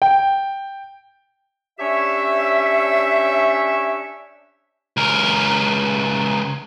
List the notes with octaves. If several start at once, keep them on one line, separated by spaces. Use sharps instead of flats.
G5
C#4 D4 G4 C#5 E5
C#2 A#4